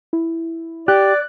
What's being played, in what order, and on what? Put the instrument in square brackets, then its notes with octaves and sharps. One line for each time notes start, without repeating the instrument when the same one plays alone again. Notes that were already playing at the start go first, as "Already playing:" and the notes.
[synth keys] E4
[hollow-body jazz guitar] G4 [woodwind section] D5 [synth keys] F#6